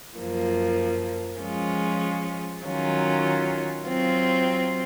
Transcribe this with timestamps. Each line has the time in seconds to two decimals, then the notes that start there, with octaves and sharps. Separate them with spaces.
0.18 F#2 F3 A#3
1.41 F3 G#3 C#4 F4
2.63 D#3 F#3 C#4 F4
3.86 F#3 C4 F4